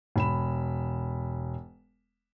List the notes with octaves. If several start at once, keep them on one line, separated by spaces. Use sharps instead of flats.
E1 B5 E7